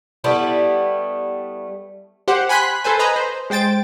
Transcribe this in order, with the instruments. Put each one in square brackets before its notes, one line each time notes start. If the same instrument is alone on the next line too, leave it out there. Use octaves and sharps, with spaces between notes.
[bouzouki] G3 A3 B3 E4
[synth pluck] G4 C5 F#5
G#5 B5 C6 F#6 B6
A4 B4 C5 G#5
B4 D#5 G#5 A#5 B5
C5
G#3 C5 G5 A6 D7